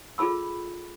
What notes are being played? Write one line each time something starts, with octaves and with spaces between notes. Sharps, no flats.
F4 G#4 A4 B5 E6